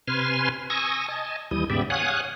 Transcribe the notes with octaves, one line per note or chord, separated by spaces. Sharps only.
C3 B4 G#5 C6 F6
G#5 C#6 D#6 E6 A#6
D#5 G#5 A5
D#2 E3 G3 D#6
G#2 C#3 B3 G4 D5 E5
C#5 F5 F#5 G#5 D#6 F#6